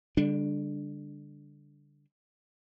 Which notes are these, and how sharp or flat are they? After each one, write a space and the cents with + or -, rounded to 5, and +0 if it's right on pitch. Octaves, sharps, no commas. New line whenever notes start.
D3 -20 G3 +25 D4 +0